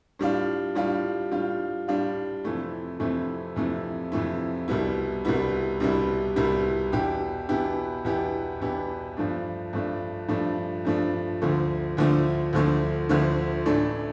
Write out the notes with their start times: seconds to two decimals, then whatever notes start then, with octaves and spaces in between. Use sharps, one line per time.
0.19 A2 G3 D4 F4
0.75 A2 G3 D4 F4
1.32 A2 G3 D4 F4
1.88 A2 G3 D4 F4
2.44 F2 C3 E3 A3 E4
2.99 F2 C3 E3 A3 E4
3.56 F2 C3 E3 A3 E4
4.12 F2 C3 E3 A3 E4
4.68 C2 B2 G3 B3 E4
5.25 C2 B2 G3 B3 E4
5.80 C2 B2 G3 B3 E4
6.36 C2 B2 G3 B3 E4
6.92 E2 B2 B3 E4 G4
7.49 E2 B2 B3 E4 G4
8.04 E2 B2 B3 E4 G4
8.60 E2 B2 B3 E4 G4
9.17 G2 F3 A3 D4
9.73 G2 F3 A3 D4
10.28 G2 F3 A3 D4
10.85 G2 F3 A3 D4
11.42 D2 D3 F3 A3
11.97 D2 D3 F3 A3
12.53 D2 D3 F3 A3
13.09 D2 D3 F3 A3
13.66 A1 A2 E3 A3 D4